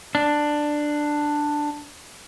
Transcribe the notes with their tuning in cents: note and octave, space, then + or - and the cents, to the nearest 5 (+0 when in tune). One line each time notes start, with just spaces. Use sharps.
D4 +10